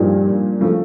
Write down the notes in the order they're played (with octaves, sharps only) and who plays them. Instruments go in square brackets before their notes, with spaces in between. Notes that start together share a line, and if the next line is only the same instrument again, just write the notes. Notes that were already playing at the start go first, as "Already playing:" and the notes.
Already playing: [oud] G2 [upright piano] A#2 F3 A#3 D#4
[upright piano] C#3 F3 A3